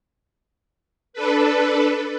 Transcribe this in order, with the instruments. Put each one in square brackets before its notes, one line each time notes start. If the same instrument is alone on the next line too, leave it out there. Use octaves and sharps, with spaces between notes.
[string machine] D4 A4 B4